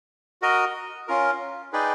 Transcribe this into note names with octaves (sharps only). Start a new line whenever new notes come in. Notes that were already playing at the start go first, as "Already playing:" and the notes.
F#4 A#4 D#5
C#4 F4 A#4
D#4 G#4 B4 D5 G5